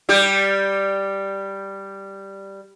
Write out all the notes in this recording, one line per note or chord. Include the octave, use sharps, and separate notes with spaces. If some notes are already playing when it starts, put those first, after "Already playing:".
G3 G4